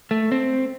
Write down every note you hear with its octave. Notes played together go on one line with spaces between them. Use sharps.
A3
C4